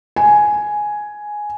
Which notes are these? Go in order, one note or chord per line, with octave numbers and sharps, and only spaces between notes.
G#5